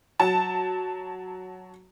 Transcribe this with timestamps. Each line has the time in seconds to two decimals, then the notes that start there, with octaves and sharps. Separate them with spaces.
0.20 F#3 A5